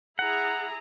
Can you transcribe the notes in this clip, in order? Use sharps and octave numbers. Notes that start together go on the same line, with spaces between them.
E4 G#4 F#5 A#5